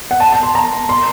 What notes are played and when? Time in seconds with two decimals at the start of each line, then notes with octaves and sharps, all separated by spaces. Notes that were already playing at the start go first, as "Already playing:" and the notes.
0.11 F#5
0.20 A5
0.32 A5
0.43 C6
0.55 A#5
0.89 C6